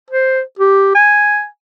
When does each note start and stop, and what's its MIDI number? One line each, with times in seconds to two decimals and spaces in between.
0.10 0.41 72
0.59 0.94 67
0.95 1.46 80